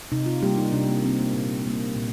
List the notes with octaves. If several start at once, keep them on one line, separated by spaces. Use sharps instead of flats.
C3 D#4
F4
G3 A#3 G4
D#4
C3 D4
A#3
G3 A#3 C4
A#3
A#2
G3 A#3
A#2